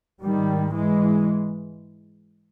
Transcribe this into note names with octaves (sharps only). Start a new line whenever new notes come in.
G#2 D#3 G3
E3 G#3